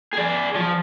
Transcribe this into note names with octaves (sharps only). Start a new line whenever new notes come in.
G#4 D5
F3